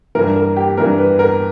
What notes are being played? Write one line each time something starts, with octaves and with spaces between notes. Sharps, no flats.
G2 E3 A#4
A#4
G4
G2 E3 A#4
B4
A#4